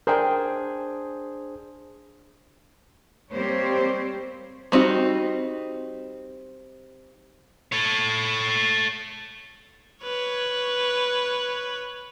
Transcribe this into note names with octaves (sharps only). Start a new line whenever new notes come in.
D4 G#4 A#4 C5 G5
G3 A#3 C4 G4 C5 C#5
G3 C4 D#4 F#4
A4 C#5
B4 C#5